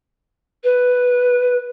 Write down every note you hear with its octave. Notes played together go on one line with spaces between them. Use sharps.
B4